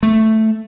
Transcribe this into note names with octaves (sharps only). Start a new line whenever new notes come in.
A3